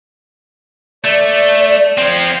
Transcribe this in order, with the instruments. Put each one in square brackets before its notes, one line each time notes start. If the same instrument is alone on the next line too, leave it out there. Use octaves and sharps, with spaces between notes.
[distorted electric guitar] A3 [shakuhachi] D5
[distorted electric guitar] F3 C4